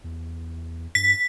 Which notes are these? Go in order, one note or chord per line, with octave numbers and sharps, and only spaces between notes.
E2
G2 B6